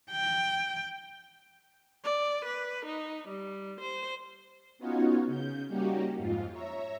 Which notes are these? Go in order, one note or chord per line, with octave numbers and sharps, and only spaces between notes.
G5
D5
B4
D#4
G3
C5
B3 C#4 D#4 F4 F#4 C#5
C#3 G6
G3 A#3 C#4 D#4 F#4 G4
F2 G#2 F4
C#5 E5 A#5